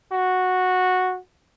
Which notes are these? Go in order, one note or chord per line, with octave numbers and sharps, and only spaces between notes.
F#4